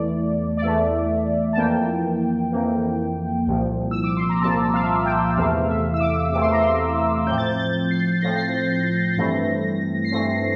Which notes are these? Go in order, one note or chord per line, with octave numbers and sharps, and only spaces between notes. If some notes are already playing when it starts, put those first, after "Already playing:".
Already playing: E2 E3 A3 D5
D5
E2 E3 A3 E5
A5
F2 E3 A#3 G5
F2 E3 A#3
C2 A#2 F3
E6
D6
C6
A#5
C2 A#2 F3 A5
F5
E5
F5
G5
E2 C3 E3 A3 F5
E5
E6
D6
E2 C3 E3 A3 D6
C6
A#5
C6
A2 F3 C4 G6
A6
G6
A6
C7
A2 F3 C4 A#6
C7
A#6
G2 E3 A3 C4
C7
G2 E3 A3 C4 A#6